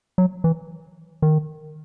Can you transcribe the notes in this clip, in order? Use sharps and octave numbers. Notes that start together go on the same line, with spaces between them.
F#3
E3
D#3